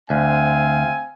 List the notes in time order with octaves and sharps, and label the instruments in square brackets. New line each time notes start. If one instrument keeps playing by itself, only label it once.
[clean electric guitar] D2 [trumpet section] C4 F5 G#5